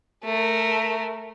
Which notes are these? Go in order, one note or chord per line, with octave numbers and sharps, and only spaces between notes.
A3 A#4